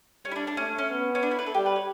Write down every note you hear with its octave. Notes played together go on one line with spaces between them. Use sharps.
G3 C#4
E4
D4
D4
A3 C#4
C#4
B3
C#4
D4
E4
B4
A4
G3 G4
B4
C#5